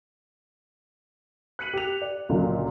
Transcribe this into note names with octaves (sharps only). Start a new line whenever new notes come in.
F#6 B6 C#7 D#7 F#7
G4 F7
D5
C#2 A#2 D3 F#3